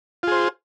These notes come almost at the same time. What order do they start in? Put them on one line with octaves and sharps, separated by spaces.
F4 G#4 C5